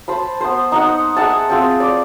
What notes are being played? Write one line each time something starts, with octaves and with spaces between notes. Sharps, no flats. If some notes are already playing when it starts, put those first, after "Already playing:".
C5 A5 B5
B3 C5
D#4 D#5 F#5
G#4 E5 F#5 A5
C4 F4 G#4 G5
D5